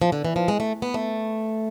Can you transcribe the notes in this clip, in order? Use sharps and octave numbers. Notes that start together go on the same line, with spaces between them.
F3
D3
E3
F3
G#3
A3
B3
A3